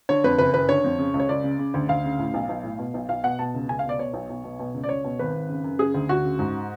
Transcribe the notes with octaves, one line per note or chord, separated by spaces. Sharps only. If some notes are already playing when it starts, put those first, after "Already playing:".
D3 C#5
F2 B4
F#1 B4
F#1 B4
D3 C#5
F2
C#3
C#2
C#5
C#2 D5
C#3
C#3
D2
D2 F5
C#3
A2
B1
B1
A2
B2
B1
B1 F5
B2 F#5
B2 A5
C#2
C#2 G#5
B2 F5
D5
B2 C#5
B1
B1
B2
B2
C#2
D5
C#2 C#5
B2
G#1 B4
G#1
C#3
F#2
C#3 G#4
D2
D2 F#4
C#3
G#2